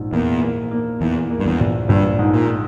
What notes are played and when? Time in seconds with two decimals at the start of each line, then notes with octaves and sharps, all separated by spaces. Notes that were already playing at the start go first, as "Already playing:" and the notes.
Already playing: A#1 G#2
0.12 E2 A#3
0.42 A#3
0.71 A#3
1.01 E2 E3
1.30 A#3
1.39 G2
1.46 E2
1.60 A#1
1.89 A#1 G2
2.19 G#2
2.34 A#2